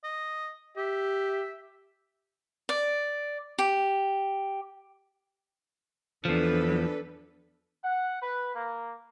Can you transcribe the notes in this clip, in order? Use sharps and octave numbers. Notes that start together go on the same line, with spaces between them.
D#5
G4 E5
D5
G4
E2 F3 D4 A4 B4
F#5
B4
A#3